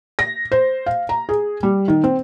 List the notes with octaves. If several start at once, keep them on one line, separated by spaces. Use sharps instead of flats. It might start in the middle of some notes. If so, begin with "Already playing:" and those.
A#6
C5
F5
A#5
G#4
G3
D#3
C4